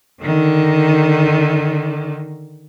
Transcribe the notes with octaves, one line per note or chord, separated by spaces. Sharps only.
D3 D#3